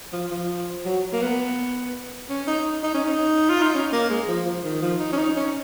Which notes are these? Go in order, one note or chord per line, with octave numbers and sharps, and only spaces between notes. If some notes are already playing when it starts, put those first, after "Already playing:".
F3
F3
F#3
A#3
B3
C#4
D#4
D#4
C#4
D#4
F4
D#4
C#4
A#3
G#3
F3
F3
D#3
F3
D#4
C#4
D#4
C#4